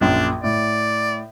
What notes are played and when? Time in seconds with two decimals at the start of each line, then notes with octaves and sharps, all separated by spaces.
0.01 A#1 F#2 D4
0.44 A2 D5